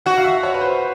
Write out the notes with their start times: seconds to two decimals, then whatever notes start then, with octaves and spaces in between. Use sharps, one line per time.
0.06 F#4 F#5
0.18 F5
0.24 E5
0.43 C#5
0.54 B4
0.61 C5